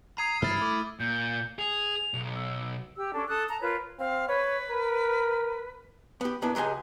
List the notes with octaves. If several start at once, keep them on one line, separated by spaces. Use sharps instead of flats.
A#5 D#6 G#6 C7 D#7
G2 E4 F6 A6
A3 D6
A#2 G6
G#4 F7
B1
E6
G4 E6
C#4 D4 A4
A4 D#6 F#6
A5 A#5
F4 A#4 B4 C#5
C4 F5
B4 C#5
A#4
B3 G4
A#2 B3 D4 E4
C#2 F#3 G#3 G4 G#5